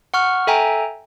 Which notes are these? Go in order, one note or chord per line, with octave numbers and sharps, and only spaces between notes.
F#5 C#6 F6
A4 E5 G5 G#5 A#5